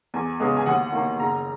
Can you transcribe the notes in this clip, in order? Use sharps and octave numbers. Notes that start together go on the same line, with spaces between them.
E2 G#5
C#3 G#3 B3
G#5
D#2 F#5
D#3 A#3
F#1 A#5